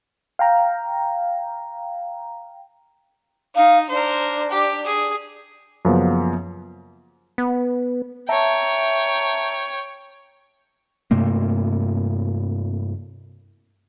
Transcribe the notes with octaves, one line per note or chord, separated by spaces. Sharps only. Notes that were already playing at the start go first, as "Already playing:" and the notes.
F5 G5 A#5
D#4 F5
D4 A#4 C5
G4
G#4
F#2 C#3 F3 A#3 B3
B3
C#5 E5 G5 A5 A#5
G2 C3 A3 A#3